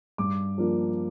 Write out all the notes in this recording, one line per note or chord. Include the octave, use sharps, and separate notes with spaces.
G2 D6
F3 A#3 D4